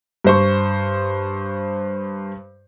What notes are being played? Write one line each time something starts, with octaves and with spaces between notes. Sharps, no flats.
G2 C5 C#6